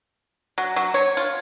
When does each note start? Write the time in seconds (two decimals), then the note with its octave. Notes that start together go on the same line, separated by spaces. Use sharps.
0.58 F#3
0.76 F#3
0.94 C#5
1.17 F4